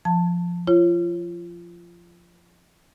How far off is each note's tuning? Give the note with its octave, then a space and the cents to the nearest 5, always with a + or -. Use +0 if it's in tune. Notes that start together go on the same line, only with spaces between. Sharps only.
F3 +0 A5 +10
F4 -25 C#5 -30